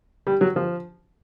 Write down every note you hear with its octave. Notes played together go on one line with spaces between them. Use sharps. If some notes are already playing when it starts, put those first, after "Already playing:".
G3
F#3
F3